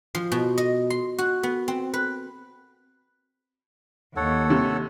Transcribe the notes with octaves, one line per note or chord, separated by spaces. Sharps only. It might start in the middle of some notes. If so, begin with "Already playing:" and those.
F3
B2
D#5
C6
F#4
B3
C4
B4
D#2 A4 C#5 F#5
C3